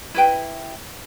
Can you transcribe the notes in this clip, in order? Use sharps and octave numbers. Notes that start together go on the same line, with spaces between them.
E4 B4 G5